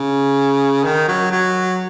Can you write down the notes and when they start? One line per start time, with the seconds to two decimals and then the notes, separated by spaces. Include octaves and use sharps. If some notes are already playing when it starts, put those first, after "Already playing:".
Already playing: C#3
0.85 D#3
1.08 F#3
1.32 F#3